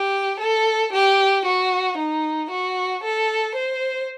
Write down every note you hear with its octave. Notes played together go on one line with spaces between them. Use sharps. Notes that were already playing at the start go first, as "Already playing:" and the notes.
Already playing: G4
A4
G4
F#4
D#4
F#4
A4
C5